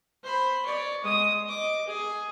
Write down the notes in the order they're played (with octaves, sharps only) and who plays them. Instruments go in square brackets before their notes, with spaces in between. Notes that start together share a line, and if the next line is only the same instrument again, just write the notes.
[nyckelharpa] C5 B5
C#5 D5
G#3 D#6
D#5 D6
G#4